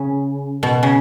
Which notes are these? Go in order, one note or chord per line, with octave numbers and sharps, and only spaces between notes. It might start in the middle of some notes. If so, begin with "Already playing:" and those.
Already playing: C#3
B2
C#3